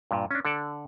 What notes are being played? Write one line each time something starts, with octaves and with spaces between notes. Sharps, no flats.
G2 A#2
C#4 D4
D3 A4 D5